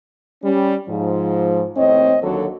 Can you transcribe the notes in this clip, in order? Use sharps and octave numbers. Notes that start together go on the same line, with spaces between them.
G3 C#4
G#2 F3
D#2 A2 C4 C#5 D#5
D#2 D3 F#3 F#4 A4